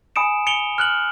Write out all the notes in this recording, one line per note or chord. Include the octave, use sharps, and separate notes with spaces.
G#5 B5 D#6 C#7 D7 E7
C#7 D7 F7 G7
F6 F#6 F#7